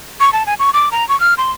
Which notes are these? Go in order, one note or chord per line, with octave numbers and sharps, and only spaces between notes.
C#6
A5
G#5
C#6
D6
A#5
C#6
F6
C6